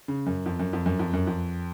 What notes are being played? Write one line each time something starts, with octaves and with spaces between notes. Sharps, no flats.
C#3
F#2
F2
F#2
F2
F#2
F2
F#2
F2